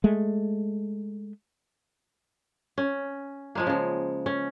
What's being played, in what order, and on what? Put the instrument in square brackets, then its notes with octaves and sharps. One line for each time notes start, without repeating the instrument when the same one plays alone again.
[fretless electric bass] G#3 A3
[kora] C#4
F3 G#3 A#3
C#3 F3
C#4